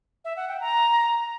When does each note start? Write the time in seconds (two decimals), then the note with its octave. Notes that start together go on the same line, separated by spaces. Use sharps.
0.25 E5
0.37 F#5
0.48 G5
0.60 A#5